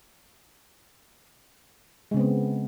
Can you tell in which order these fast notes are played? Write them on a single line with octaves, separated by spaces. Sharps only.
G#3 C#3 C4 B3